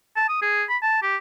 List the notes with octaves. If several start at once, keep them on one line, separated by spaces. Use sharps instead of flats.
A5
D#6
G#4
B5
A5
G4